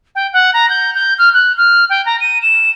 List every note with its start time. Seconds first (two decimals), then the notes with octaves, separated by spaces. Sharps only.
0.15 G5
0.32 F#5
0.53 A#5
0.69 G6
0.94 G6
1.18 F6
1.33 F#6
1.57 F6
1.89 G5
2.05 A#5
2.20 D#7
2.42 E7